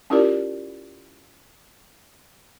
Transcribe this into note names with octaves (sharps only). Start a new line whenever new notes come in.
C#4 E4 F4 G4 A#4 D5